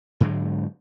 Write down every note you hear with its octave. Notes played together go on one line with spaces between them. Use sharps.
G#2 D3 F#3 G#3